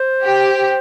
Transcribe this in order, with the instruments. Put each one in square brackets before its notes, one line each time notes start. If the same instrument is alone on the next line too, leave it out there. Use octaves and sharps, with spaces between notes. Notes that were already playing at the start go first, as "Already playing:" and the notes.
Already playing: [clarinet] C5
[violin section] G4